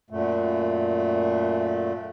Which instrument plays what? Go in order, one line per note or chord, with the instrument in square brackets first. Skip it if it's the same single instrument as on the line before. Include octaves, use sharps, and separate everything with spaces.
[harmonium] F#2 A#2 A3